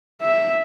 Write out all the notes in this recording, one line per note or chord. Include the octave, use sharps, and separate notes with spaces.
E5